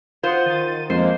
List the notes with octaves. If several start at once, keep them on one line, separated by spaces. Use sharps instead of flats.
F4 C5 F#5 D#6
D#3 A6 D#7
F2 G#3 A#3 C5